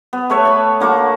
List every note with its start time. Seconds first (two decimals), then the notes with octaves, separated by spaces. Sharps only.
0.13 B3
0.30 A3 B4 C#5 E5
0.45 A5 B5
0.80 D3 A#3 F#4 D6